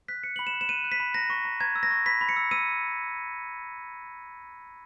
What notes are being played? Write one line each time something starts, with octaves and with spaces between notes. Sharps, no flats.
F#6 B6
F#6 C#7
B5 F#7
E7
F#6
E7
F#6 D#7
F#6
B6
B5
A#5 A#6
C#6
A#5
A#5 G#6
E6
A#6
C#6
B5 B6
B5
C#7
E6
E6 D#7